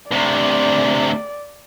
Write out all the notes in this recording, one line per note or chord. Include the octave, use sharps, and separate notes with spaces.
D2 C3 D5